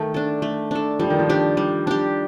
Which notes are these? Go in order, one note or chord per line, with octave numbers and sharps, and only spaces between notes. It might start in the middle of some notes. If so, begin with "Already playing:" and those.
Already playing: D#3 A3
D4 A4
A3
D4 A4
F3 G3
D#3
F3
D4 G4
G3
D4 G4